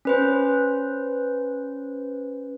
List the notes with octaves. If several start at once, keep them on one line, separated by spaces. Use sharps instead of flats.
C#4 B4 C5